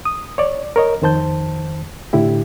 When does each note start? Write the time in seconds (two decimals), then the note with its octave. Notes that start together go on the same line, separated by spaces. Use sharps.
0.05 D#6
0.38 C#5 D5
0.76 A#4 C#5 D#5
1.02 F2 D#3 C5 A5 G6
2.13 A2 D3 E4 G4